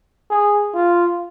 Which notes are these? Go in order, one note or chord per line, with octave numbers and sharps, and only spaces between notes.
G#4
F4